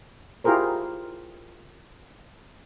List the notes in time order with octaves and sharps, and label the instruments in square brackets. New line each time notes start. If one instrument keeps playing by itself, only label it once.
[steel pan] E4 F4 G4 G#4 A#4 C5